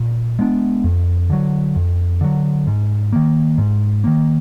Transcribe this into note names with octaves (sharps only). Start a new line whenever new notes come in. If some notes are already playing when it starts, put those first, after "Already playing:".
Already playing: A#2
G#3 B3 D4
F2
D3 F#3
F2
D3 F#3
G#2
D#3 A#3
G#2
D#3 A#3